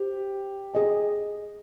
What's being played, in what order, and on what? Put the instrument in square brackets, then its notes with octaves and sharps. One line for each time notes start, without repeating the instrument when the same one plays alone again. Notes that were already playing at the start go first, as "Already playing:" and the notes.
Already playing: [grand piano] G4 [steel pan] C5
[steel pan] G#4 D#5 G#5